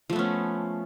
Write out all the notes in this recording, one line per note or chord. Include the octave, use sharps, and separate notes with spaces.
F3 A3 B3 C#4